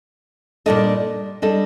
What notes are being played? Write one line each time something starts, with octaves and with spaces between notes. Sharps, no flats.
A#2 G3 D4 A4 D#5
G3 D4 A4 D#5